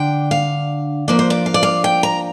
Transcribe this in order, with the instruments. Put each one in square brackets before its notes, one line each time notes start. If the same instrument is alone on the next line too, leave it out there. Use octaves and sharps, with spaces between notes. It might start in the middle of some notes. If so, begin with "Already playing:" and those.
Already playing: [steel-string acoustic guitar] D3 D4 G5
F5
F3 A#3 D4 D5
C5
D5
F5
D5
F5
G5
A#5